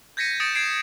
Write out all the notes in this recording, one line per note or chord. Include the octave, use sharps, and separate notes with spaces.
G6 G#6 A#6 B6 C#7 D#7
D#6 G6 A6 C#7 D7 E7
G#6 A6 C7 D7 E7